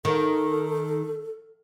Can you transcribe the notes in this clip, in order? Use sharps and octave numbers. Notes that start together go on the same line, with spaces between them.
D#3 A4